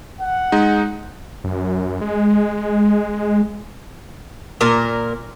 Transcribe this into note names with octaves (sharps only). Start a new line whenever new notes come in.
F#5
G#3 D#4
F#2
G#3
A#2 A#4